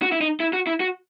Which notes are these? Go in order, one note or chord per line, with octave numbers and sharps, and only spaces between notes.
F#4
E4
D#4
E4
F#4
E4
F#4